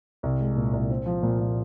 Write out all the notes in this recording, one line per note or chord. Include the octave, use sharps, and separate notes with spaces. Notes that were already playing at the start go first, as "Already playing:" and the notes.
C2
G#3
A#2
C2
C4
F3
A#2
A#2